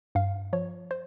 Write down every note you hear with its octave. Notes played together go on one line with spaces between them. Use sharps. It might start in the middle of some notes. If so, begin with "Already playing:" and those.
G2 F5
F3 C#5
C5